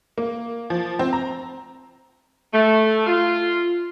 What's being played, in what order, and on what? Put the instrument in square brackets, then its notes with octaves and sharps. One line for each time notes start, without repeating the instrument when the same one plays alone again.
[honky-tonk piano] A#3
F3
C4
A#5
[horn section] A3
F4